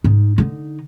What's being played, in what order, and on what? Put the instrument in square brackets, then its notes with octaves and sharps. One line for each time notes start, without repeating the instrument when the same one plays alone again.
[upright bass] G#2 D#4
D3 D#4